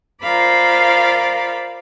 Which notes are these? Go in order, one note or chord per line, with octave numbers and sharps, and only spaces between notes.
F4 A#4 C5 D5 F5 B5